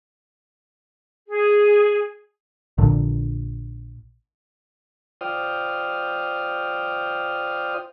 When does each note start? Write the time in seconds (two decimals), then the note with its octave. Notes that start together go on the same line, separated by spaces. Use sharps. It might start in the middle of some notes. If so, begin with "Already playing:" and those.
1.28 G#4
2.78 A#1 A#2 D3
5.21 F4 C5 D5 G5 D#6 F6